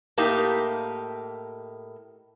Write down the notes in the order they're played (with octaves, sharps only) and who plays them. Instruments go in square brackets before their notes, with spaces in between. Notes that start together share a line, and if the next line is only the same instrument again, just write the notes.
[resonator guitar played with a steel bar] A2 A#3 D#4 G4